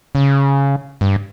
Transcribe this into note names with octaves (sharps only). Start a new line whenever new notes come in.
C#3
G2